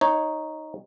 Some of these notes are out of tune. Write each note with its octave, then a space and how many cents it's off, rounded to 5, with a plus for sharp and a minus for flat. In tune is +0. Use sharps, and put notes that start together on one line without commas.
D#4 +0 C#5 -10